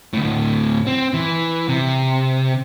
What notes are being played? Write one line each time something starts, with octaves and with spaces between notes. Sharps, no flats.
D2 A2
C4
E3
C3